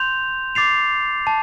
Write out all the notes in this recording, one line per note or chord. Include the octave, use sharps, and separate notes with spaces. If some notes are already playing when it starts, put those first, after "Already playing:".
Already playing: C6 G6 F7
D6 A6 C7 F7
A5